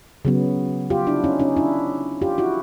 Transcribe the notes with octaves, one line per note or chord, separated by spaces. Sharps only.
C#3 F#3 B3
F4 G4
D4 E4
C#4 D#4
C#4 D#4
D4 E4
F4 G4
E4 F#4